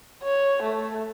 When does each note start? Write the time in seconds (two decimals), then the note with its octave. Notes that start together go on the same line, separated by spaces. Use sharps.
0.23 C#5
0.62 A3